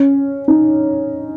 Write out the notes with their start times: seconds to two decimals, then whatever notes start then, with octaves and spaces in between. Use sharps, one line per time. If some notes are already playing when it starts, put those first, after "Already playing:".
Already playing: C#4
0.48 D#4